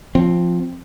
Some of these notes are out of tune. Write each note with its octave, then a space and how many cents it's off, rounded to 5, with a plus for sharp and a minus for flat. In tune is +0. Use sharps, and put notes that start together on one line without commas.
F3 +0 C4 +5